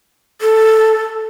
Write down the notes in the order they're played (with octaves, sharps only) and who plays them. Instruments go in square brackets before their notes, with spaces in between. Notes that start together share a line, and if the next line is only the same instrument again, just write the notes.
[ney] A4